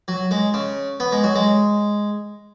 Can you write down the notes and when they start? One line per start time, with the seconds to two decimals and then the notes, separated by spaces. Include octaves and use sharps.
0.08 F#3
0.31 G#3
0.54 C#3
1.00 B3
1.12 G#3
1.24 F#3
1.35 G#3